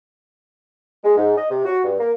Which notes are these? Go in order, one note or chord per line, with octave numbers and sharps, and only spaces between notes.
G#3
G#2
D#5
C3
F#4
G2
A#3